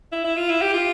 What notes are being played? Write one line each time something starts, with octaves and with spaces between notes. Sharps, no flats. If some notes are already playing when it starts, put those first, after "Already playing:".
E4
E4
F4
E4
G4
F4